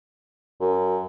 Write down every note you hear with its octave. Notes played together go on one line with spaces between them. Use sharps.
F#2